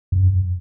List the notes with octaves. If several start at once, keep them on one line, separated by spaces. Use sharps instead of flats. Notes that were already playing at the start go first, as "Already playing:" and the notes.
F#2